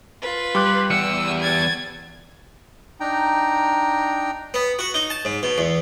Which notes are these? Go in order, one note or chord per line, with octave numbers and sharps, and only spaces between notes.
F4 B4
G3 C6 D6 F#6
E2 F#5 E6 C#7
G#6 A6
D4 D#4 G5 A#5
B3
F#4
D#4
A5
G#2
B2
E2